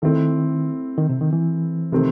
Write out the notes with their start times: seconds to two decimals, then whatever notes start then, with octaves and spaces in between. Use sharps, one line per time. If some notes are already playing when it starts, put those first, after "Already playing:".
0.02 D#3 A3 C4 E4 A4
0.98 D#3
1.09 C3
1.21 D#3
1.33 E3
1.92 C3 D#3 A3 C4